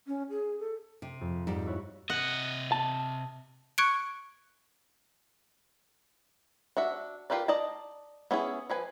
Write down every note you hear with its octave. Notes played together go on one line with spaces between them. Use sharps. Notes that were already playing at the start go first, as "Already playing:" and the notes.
C#4
G#4
A4
C3
F2
G#2 G3
E4 F#4 C#5
C3 D#5 F#5
A5
C#6 F#6 G#6 C#7 D7
D4 F#4 E5
F4 G4 A#4 B4 D5
D5 D#5 A5 A#5
B3 C#4 E4 G#4
F3 B4 G#5